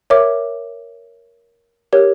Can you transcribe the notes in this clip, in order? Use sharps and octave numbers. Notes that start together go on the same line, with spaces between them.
A#4 C#5 E5 D6
G4 A#4 C#5